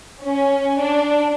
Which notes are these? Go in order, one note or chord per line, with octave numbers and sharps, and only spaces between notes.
C#4
D4